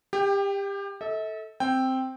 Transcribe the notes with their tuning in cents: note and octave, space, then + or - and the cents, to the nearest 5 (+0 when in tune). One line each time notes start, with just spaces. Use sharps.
G4 +25 G5 +0
A4 +0 E5 -45
C4 +0 G5 +0